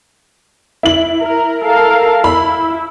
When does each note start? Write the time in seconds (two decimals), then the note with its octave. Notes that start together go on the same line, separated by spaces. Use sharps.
0.83 E4 F#7
1.21 A#4
1.63 A4 A#4 F5
2.24 E4 B5